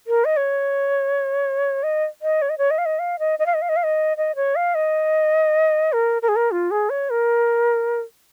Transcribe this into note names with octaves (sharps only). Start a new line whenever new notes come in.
A#4
D#5
C#5
D#5
D#5
C#5
D#5
C#5
D#5
F5
D#5
F5
D#5
D#5
F5
D#5
F5
D#5
F5
D#5
D#5
C#5
F5
D#5
A#4
A#4
G#4
A#4
F4
G#4
C#5
A#4